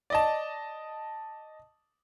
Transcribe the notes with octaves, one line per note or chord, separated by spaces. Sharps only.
D5 D#5 A5